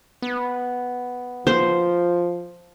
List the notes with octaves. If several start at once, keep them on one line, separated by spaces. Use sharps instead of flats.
B3
F3 C5